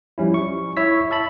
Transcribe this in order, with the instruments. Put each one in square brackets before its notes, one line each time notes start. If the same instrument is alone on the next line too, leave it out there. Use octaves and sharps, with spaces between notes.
[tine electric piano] F3 G3 C#4 E4
C#6
E4 C#5 E6 B6
E5 A5 B5